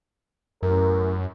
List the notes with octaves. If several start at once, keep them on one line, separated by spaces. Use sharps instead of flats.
A1 F#2 A#4